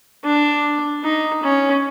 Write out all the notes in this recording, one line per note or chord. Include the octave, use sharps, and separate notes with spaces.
D4
D#4
C#4